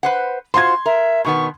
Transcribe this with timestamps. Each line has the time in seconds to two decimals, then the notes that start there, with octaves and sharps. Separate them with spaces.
0.03 B4 C5 F#5
0.54 F4 F#4 C5 C6 G#6
0.86 A#4 E5
1.25 B2 D#3 B3 C#6